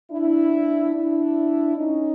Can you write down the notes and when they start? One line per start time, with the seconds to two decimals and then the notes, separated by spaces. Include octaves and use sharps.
0.12 D4 E4
0.94 D4 E4
1.77 C#4 D#4